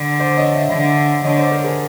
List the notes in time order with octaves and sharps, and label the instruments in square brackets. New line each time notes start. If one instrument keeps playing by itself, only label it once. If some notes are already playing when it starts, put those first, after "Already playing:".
Already playing: [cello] D3
[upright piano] C5 D5
C#5 D#5
D5 E5
[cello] D3
[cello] D3 [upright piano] C#5 D#5
[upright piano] C5 D5
A#4 C5
G#4 A#4